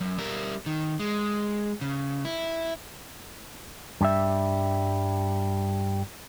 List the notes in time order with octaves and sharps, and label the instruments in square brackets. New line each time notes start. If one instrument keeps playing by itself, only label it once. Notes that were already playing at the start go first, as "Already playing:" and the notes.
[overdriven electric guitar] F#2
G3 A#4
D#3
G#3
C#3
E4
[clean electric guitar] G2 G3 E5